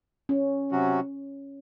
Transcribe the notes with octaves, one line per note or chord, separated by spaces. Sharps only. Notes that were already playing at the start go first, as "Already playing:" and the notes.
C#4
C3 F#3 C#4 F#4